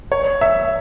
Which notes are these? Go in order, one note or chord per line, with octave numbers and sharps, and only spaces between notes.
C#5
E5